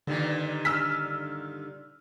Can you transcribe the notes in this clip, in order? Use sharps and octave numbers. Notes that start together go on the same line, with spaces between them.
G2 A#2 D3 D#3
E6 F6 B6